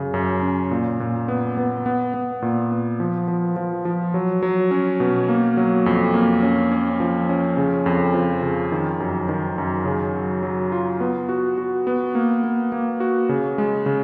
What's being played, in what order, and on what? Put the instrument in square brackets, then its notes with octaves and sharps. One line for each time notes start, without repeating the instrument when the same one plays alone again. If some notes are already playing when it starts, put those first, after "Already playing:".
Already playing: [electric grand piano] F#2 C#3
F#2
C#4
A#2
A#2
B3
B3
B3
B3
A#2
B3
F3
F3
F3
F3
F#3
F#3
C#4
B2
A#3
F#3
F2
A#3
C#4
C#4
F3
C#4
C#3
F2
F3
C#3
D#3
F#2
D#3
F#2
C#3
F#3
F#3
F4
B3
F#4
F#4
B3
A#3
A#3
A#3
F#4
C#3
G#3
C#3